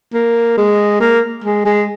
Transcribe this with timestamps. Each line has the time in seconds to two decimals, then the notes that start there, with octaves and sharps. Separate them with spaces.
0.14 A#3
0.58 G#3
1.01 A#3
1.45 G#3
1.66 G#3